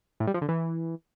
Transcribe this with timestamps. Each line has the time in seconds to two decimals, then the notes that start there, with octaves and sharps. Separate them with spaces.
0.20 A2
0.27 G3
0.34 F3
0.41 D3
0.49 E3